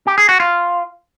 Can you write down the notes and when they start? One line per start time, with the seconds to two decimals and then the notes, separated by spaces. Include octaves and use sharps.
0.07 G4
0.18 G#4
0.29 F#4
0.40 F4